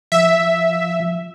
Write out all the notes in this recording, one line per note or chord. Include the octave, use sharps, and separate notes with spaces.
F3 E5